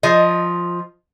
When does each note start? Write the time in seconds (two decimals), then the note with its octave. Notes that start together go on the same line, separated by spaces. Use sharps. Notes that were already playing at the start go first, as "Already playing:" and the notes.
0.03 F3 D#5